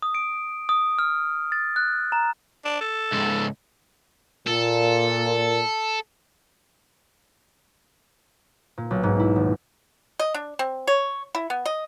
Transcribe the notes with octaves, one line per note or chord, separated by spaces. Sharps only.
D#6
D7
D#6
F6
A6
F#6
A#5
D4
A4
C#2 G#2
A#2 A4
A#2
B1
G#2
E4
D#1
D#5
D4
C4
C#5
E4
B3
D#5